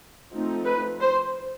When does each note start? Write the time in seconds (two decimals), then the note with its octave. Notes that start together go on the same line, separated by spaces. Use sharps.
0.32 F3 A3 C4 D#4
0.66 B4
1.00 C5